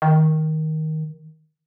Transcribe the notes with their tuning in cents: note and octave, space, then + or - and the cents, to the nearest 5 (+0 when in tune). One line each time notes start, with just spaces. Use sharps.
D#3 +10